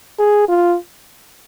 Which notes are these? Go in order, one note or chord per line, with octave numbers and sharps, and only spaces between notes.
G#4
F4